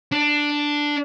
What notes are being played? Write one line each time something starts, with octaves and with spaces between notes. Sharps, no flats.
D4